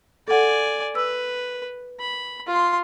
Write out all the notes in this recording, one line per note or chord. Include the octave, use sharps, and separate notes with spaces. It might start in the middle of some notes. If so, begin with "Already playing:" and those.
A4 D5 F#5 G#5
B4 E6
B5
F4 C6